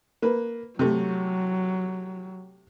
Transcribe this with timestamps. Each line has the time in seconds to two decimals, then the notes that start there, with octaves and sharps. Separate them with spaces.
0.22 A#3 B4
0.79 C3 F#3 A3